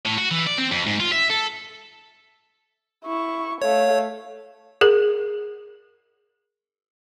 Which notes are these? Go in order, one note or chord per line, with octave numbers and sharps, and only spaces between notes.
A2
F#4
E3
D5
C4
F2
G#2
F4
E5
A4
E4 C#6
A3 C#5 F5
G#4 A#4